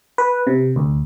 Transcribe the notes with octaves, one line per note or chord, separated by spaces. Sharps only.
B4
C3
D2